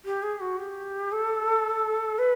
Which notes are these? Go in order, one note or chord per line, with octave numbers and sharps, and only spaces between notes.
G4
G#4
F#4
G4
A4
B4